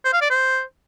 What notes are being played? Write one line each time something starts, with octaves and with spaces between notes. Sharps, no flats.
C5
F5
D5
C5